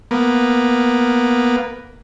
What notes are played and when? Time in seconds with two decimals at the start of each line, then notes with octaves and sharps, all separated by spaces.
0.11 A#3 B3